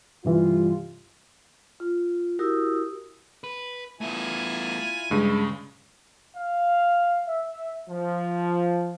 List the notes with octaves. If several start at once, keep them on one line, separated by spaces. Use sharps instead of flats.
G2 C3 E3 G3 F4
F4
E4 F#4 G4 A#4 D#6 E6
B4
A3 B3 E4 F4 G#5
G2 C#3 G#3
F5
E5
F3